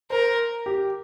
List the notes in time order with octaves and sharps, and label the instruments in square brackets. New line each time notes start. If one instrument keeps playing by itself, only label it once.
[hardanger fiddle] A#4 [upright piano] C5
[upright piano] G4